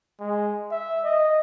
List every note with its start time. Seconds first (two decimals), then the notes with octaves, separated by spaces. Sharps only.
0.20 G#3
0.71 E5
1.04 D#5